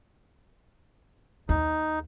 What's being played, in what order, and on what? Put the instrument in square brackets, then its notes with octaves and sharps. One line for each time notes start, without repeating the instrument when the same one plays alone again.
[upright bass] D#2 [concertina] D#4